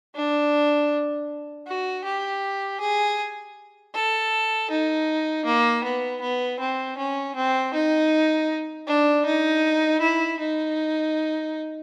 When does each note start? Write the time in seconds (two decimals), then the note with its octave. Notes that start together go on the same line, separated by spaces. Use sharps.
0.15 D4
1.67 F#4
2.05 G4
2.81 G#4
3.95 A4
4.71 D#4
5.46 A#3
5.84 B3
6.21 B3
6.60 C4
6.98 C#4
7.36 C4
7.74 D#4
8.87 D4
9.26 D#4
10.01 E4
10.40 D#4